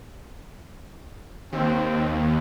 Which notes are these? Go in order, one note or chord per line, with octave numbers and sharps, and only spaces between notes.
D#2 C4